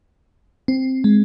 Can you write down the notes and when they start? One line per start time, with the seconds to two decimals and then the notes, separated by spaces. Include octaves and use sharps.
0.68 C4
1.04 G#3